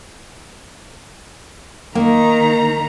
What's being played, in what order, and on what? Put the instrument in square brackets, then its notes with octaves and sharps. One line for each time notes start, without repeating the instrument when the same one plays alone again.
[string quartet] D#3 A#5 [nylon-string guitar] A#3